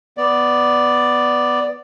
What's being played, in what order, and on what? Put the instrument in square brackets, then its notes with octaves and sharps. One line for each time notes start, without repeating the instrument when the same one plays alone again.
[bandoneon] B3 D5